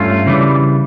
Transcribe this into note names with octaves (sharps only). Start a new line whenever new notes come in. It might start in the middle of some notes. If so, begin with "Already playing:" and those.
Already playing: G2 A3 C#4 F4
C#3 E3 G3 D4